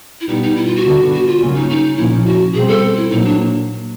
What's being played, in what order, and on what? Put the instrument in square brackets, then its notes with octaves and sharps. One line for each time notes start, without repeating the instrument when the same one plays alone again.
[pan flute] E4
[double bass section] B2 G3 B3 [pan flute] D#4
[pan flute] D#4
E4
F4
F#4
[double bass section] D3 G3 B3
[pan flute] F#4
F4
[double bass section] C#3 F#3 A#3 C#4
[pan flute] D#4
D#4
[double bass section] A#2 F3 A#3 C#4 [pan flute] E4
[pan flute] F#4
[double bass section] B2 G3 C4 [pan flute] G#4
[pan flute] A4
E4
[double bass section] A#2 F#3 A#3 [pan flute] D#4
[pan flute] D4